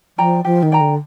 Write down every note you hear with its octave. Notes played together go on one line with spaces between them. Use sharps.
F3 D5 G5 A#5
F3 G4
D#3
D5 G5 A#5
D3